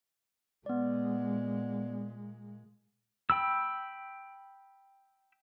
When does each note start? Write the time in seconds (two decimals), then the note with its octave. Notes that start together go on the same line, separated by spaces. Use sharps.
0.66 A#2 G#3 B3 D5
3.30 G5 B5 E6